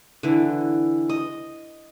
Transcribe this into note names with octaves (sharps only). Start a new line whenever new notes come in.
D3 E3
D#5